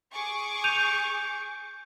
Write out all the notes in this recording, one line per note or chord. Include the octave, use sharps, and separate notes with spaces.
G#4 C#6 D6
G6 D#7 F7